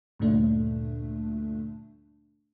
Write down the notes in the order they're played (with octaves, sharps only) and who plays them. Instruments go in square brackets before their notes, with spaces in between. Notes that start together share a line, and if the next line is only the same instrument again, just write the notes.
[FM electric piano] D2 G2 A#2 D3 A3 D4